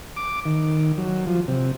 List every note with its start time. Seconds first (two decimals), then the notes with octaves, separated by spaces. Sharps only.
0.16 D6
0.46 D#3
0.98 F#3
1.27 F3
1.48 C3